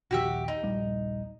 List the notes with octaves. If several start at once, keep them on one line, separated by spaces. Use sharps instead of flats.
A#1 D#2 F#4 G4 E5
D#4
D#1 A#1 G3